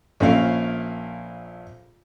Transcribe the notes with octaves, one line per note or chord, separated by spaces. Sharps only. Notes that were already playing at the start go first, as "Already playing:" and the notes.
A#1 A3 A#3 C#4 A#4 F5